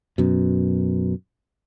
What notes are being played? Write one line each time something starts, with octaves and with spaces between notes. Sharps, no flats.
F#2 B2